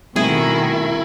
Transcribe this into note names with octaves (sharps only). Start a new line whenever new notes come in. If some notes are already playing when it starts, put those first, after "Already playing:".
B2 D#3 G3 A3 C4 E4 G#4